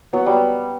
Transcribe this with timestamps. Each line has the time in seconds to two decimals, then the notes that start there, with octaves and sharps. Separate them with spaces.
0.13 F#3 B3
0.26 G3
0.33 B3